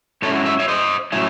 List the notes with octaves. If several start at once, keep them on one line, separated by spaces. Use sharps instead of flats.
G#2 F#3 C#4 E4 A4 C#5
E5
C#5 E5
C5 D#5
A2 F#3 A3 C#4 E4